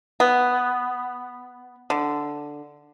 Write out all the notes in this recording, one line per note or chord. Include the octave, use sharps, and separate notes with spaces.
B3
D3